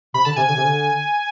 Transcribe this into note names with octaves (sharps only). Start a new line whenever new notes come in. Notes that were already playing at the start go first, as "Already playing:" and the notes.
C3 B5
D3 A5
C3 G#5
D3 G#5
C3
D3